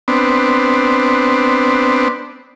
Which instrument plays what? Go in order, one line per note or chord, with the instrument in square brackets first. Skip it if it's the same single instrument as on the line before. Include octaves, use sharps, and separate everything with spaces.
[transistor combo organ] B3 C4 D4